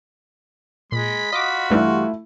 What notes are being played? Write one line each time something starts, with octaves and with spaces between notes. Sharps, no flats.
A#2 G#3 B5
F4 F#4 D#5 D6
G2 E3 G3 A3 E4